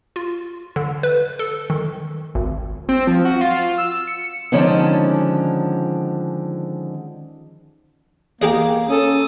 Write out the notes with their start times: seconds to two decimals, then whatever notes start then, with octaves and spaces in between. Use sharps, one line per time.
0.16 F4
0.76 D3
1.03 B4
1.39 A4
1.70 D#3
2.35 G#1
2.89 C4
3.07 F3
3.25 F#4
3.41 F4
3.78 E6
4.07 C#7
4.52 D3 D#3 F3 G#3 C#4 D4
8.42 A#3 G4 G#4 D#5
8.89 A#3 C#4 A4 D#6